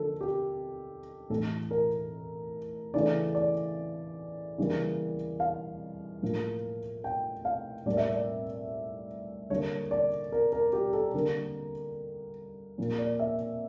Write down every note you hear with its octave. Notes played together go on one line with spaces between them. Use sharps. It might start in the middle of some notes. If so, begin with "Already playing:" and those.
Already playing: D3 F3 A#3 A4
G4
A2 E3 A3 A4
A#4
C#3 E3 A3 D5
D5
C#3 E3 G3 A#3
F5
A2 F3 A#3
G5
F5
A2 G3 A#3 D5
E5
D5
D3 G3 A#3 C#5
D5
A#4
A#4
G4
A4
D3 G3 A#3 A#4
A#2 F3 A#3
D5
E5